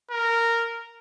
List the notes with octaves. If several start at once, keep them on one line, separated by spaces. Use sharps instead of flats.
A#4